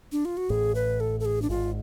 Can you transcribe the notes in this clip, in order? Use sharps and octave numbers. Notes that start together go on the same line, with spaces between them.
D4
F4
F#4
A1 A2 G#4
B4
A4
A4
G#4
D4
G#1 G#2 F4